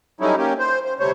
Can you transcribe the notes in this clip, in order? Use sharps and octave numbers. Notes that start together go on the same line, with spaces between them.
F#3 G3 A3 C#4 D#4 E4
A#3 C#4 G4
C5
C5
D2 C3 G3 A3 C5 C#5